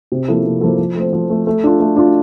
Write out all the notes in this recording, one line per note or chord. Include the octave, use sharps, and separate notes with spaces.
C3
F3 A#3 E4 A4
C3
F3 A#3 E4 A4
F3
A3 C4
F3
A3 C4
A3
D4 F4
A3
D4 F4